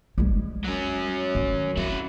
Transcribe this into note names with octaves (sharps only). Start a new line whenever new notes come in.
G3 G#3
F#3 C#4
D#3
C4 E4 F#4